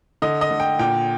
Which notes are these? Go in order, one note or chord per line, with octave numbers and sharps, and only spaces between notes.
D3 D#5
D#5
D3
G5
A#2 G5